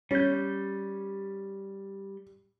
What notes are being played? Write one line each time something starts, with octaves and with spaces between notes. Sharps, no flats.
G3 C#4 G6